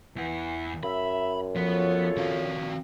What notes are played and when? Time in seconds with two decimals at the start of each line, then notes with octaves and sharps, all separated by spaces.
0.16 E2 E3 F#5
0.83 F#2 E5 B5
1.56 F3 B3 F4 A4 B4 C#5
2.17 D#3 C4 F#4 D5 F5